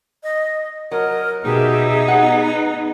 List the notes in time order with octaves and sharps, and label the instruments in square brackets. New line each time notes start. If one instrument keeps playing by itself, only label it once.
[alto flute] D#5
[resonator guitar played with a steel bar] F#3 [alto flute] A#4 [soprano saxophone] D#5
[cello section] B2 G4 E5 [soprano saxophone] D#4 [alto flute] G#4
[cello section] B3 [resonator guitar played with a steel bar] F#5